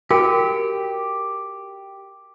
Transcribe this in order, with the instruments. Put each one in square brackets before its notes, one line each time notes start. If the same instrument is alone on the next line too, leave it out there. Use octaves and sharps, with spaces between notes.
[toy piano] F#4 A#4 G5 [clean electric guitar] G4